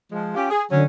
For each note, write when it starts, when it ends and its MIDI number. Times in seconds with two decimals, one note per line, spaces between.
0.12 0.32 53
0.12 0.32 56
0.35 0.48 61
0.35 0.48 65
0.35 0.48 67
0.51 0.64 68
0.71 0.85 50
0.71 0.85 54
0.71 0.85 61